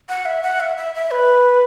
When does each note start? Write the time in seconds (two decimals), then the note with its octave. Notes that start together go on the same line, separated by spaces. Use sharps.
0.09 F#5
0.25 E5
0.43 F#5
0.60 E5
0.77 E5
0.95 E5
1.11 B4